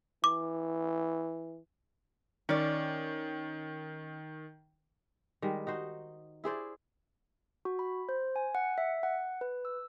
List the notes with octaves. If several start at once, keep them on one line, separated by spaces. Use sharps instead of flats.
E3 D6
D#3 C#4 D5
D#3 G3 G#3
D#4 F#4 C5
E4 G#4 C5 D5
F#4
B5
C5
G#5
F#5
E5
F#5
B4
E6